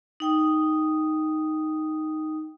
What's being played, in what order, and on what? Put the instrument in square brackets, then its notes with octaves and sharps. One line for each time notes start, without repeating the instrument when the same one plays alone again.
[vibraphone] D#4 G5 D#6